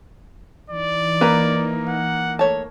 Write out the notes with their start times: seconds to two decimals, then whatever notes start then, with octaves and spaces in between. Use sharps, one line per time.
0.70 E3 D#4 D5
1.21 A#3 B4 A#5
1.88 F#5
2.39 A3 C#5 A5